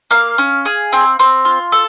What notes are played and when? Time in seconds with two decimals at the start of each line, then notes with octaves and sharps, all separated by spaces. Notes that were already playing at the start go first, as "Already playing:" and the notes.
0.11 A#3 F5
0.38 C#4
0.65 G#4
0.93 C4
1.19 C4
1.45 F4
1.72 A4